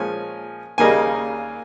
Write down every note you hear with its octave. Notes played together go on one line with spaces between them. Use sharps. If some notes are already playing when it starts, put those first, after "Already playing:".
Already playing: A#2 F3 G#3 C#4 G#5
D#2 C#3 G3 A#3 D#4 G#5